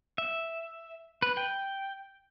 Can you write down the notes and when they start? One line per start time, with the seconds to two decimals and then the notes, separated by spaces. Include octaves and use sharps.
0.18 E5
1.22 B4
1.37 G5